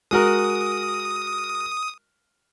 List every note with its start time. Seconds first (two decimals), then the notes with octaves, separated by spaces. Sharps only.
0.11 G#3 F#4 A#4 D#6